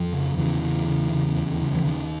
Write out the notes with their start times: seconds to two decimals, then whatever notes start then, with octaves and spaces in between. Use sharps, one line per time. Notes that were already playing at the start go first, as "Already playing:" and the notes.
Already playing: F2 F3
0.13 C#3
0.37 E2 C#3 E3
0.62 C#3
0.86 C#3
1.11 C#3
1.36 D#2
1.60 C#3
1.75 E3
1.85 D#2 D#3